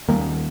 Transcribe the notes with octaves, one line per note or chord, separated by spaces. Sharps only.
D#2 D#3 G3 A#3